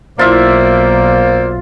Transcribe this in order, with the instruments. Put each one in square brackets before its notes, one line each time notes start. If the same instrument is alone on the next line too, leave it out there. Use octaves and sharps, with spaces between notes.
[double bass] B1 [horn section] A#3 C5 D5 [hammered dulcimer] F4 E5